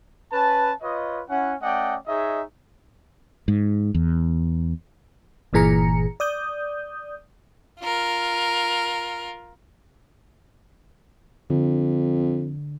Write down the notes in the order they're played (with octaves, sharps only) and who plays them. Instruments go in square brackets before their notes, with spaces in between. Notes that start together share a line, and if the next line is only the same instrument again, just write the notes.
[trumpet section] C#4 B4 A5
F4 B4 C#5 D#5
C#4 E4 F#5
A3 C#4 D5 D#5 F#5 G5
D#4 G#4 C#5 D#5 E5
[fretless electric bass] G#2
E2
[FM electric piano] G1 A#2 E3 G#4 A#5 C#7
D5 D#6 G6
[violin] F4 A#4
[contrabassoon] F2 [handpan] D3